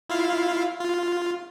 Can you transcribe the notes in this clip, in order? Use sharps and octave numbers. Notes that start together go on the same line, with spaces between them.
E4 F4 F5
F4